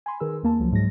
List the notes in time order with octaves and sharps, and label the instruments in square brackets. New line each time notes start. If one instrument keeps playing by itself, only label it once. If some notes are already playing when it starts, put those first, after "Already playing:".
[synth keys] G#5 B5 C6
D#3 G#4 A#4 B4 E6
D#2 A#3 A5
C#2 F3 F#3
G#2 F#3 G#3 A#6